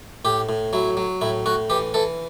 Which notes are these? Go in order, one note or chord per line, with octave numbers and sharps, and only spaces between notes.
A2 G4
A2
F#3 E4
F#3
A2 E4
A2 F#4
E3 G4
E3 A4